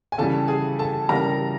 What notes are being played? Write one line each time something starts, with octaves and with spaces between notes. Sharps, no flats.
G#5
C#3 E3 G3 A4 A5
G#4 G#5
A4 A5
C#3 E3 G3 A#4 A#5